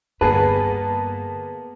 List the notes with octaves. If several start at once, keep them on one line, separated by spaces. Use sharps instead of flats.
G2 D3 A#3 B3 G#4 B4 A5